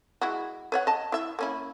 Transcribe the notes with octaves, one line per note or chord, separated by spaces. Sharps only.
G#3 E4 F#4
B4 C#5 F#5
D#5 A5
E4 E5
A#3 C#4 E4